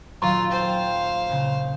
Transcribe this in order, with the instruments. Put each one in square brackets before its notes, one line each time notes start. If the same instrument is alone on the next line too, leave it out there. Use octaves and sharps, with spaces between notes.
[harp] D#1 F#3 E6 [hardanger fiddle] F4 [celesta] A#5 C6 C#6
[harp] A4 G5 [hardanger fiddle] C5 F5
[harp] A#2 C#3